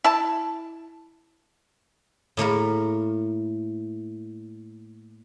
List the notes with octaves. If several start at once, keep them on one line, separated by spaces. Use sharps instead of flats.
E4 A5
A2 A3 A#3 A#4